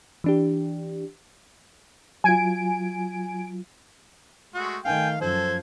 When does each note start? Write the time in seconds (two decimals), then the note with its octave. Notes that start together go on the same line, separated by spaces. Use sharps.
0.24 E3 D4 G4
2.24 F#3 F4 G#5 D7
4.54 G#3 A3 F#4
4.85 D#3 A3 F5 G5 G#5
5.21 F#2 F3 A4 C5 G#6